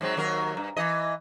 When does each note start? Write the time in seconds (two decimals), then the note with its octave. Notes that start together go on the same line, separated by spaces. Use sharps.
0.01 G#2 F#3 C4
0.17 D#2 F#3 A#4
0.57 G2
0.77 E3 D#5